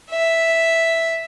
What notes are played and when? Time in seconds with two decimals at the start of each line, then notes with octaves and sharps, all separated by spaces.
0.11 E5